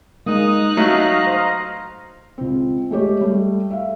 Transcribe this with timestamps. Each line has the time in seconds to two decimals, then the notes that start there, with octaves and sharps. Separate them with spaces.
0.26 G#3 A#3 D#4 D#6 F#6
0.77 F#3 A3 D#5 F5 A#5
1.27 C5
2.38 C#2 C4
2.91 G#3 A3 G4 C#5
3.21 G3 A3
3.71 E5 F5